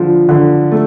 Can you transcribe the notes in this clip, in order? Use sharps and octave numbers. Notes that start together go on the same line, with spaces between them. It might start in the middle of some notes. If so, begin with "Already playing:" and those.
Already playing: D3 F3
D3
A3